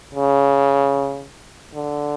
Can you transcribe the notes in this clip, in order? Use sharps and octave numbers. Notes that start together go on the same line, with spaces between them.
C#3
D3